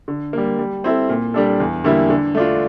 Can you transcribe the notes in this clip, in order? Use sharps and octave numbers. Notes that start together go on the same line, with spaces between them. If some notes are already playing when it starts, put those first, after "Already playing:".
D3
G3 A#3
G3
C4 E4 A4
A#2
G3 D4 A4
E2
D3 G3 A#3 E4
D3
A3 D4 F4